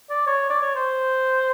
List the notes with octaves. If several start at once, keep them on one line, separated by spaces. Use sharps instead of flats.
D5
C#5
D5
C#5
C5